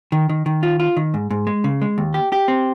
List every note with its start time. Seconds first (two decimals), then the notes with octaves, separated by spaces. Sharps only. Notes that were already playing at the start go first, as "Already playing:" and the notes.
0.12 D#3
0.29 D#3
0.46 D#3
0.63 F4
0.80 F4
0.97 D#3
1.14 G#2
1.31 G#2
1.47 G#3
1.64 C#3
1.82 G#3
1.98 D#2
2.14 G4
2.32 G4
2.48 C4